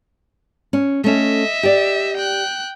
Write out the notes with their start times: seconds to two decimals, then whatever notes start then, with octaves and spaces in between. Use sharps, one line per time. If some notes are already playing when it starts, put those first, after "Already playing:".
0.73 C#4
1.04 A3 C#4 D#5 E5
1.63 G4 D5
2.17 G5 F#6